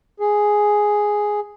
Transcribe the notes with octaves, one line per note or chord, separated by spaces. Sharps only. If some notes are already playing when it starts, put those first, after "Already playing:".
G#4